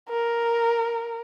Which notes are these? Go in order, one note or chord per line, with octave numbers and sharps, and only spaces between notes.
A#4